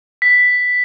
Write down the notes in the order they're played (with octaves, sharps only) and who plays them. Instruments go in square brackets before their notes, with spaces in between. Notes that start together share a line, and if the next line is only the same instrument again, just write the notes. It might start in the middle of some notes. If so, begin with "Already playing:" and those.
[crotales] B6